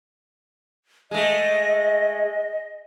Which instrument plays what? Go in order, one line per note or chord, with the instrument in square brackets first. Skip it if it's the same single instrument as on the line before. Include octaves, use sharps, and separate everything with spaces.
[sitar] G#3 A3 [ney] D#5